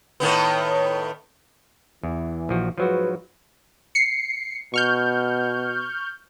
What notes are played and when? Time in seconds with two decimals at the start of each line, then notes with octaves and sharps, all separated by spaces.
0.20 A2 D#3 B3
2.03 E2 E3
2.49 A#1 F3 F#4
2.78 G#2 F3 F#3 F#4 B4
3.95 C7 C#7
4.74 B2 C#6 F6 G6